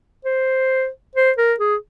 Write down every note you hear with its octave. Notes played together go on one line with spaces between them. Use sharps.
C5
C5
A#4
G#4